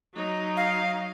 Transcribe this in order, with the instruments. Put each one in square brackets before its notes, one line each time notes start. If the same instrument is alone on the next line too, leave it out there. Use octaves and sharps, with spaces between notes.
[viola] F#3 D#4
[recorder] F5